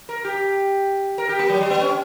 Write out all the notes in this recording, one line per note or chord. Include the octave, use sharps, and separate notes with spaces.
A#4
G4
A#4
G4
A#3
F#3
G3
B3
C#4